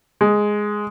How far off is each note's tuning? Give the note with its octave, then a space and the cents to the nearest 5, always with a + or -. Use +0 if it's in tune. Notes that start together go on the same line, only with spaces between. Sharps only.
G#3 +0